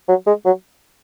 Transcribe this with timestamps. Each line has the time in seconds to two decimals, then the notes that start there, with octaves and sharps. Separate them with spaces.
0.09 F#3
0.27 G#3
0.45 F#3